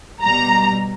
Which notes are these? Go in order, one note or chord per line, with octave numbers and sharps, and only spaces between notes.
B2 G3 A#5